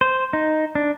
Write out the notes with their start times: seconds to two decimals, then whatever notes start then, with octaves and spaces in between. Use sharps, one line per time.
0.01 C5
0.33 D#4
0.75 D4